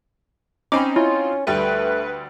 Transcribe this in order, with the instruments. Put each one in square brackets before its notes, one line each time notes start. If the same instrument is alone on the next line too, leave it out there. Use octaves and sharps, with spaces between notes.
[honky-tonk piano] C4 D#4 [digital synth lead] C#4 [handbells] B5 D6
[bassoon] C#4 [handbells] E4 [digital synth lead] F4
[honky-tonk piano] D2 G3 G5 [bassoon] A3 [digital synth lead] B4